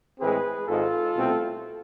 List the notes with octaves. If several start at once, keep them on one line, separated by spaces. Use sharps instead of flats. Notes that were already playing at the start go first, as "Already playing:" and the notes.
A2 E3 G#3 C4 G#4 B4
G#1 G#2 G#3 F4 A4
C2 B2 A3 C4